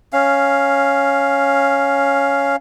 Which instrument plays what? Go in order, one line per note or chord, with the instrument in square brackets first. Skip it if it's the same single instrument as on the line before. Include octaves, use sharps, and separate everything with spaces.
[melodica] C#4 F5